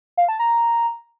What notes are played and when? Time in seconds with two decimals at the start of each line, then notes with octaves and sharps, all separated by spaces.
0.17 F5
0.28 A5
0.39 A#5